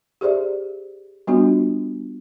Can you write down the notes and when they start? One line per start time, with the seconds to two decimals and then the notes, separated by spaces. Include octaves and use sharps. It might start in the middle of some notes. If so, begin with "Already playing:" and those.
0.21 G4 G#4 C5 D5 E5
1.27 G3 B3 D4 F4 F#4